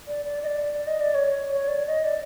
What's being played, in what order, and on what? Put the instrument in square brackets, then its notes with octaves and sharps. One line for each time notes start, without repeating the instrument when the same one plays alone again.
[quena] D5
D5
D#5
D5
D#5
D5
C#5
C#5
D5
D#5
D5